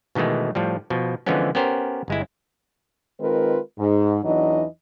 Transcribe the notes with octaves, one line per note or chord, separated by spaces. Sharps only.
B2 D#3 E3 G#3 A3
A2 F3 G3
B2 F3
D3 E3 F3 G#3 B3 C#4
B3 C#4 G4 A#4 C5
G1 G#3 E4
D#3 G#3 C4 F4 A#4 B4
G#2
E2 E3 F#3 D4 D#4 D#5